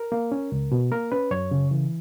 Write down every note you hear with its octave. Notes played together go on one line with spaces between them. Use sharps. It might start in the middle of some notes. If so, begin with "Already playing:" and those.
Already playing: A#4
A#3
C#4
C#2
B2
A#3 A#4
C#4 B4
F#2 C#5
C#3
E3